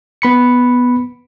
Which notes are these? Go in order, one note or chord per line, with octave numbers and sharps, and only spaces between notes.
B3 B5 C#7